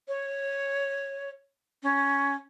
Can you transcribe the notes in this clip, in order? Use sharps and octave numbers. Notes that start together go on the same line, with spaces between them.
C#5
C#4